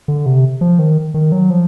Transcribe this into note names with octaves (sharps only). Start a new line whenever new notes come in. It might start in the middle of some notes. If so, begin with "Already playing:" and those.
D3
C3
F3
D#3
D#3
F#3
F3